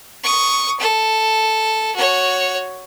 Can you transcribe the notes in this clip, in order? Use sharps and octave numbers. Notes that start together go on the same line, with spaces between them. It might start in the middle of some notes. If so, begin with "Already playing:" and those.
C#6 D#6
A4
F#4 C#5